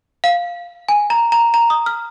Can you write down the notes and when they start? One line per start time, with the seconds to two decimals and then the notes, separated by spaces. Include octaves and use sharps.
0.24 F5
0.89 G#5
1.10 A#5
1.32 A#5
1.54 A#5
1.70 D#6
1.86 F6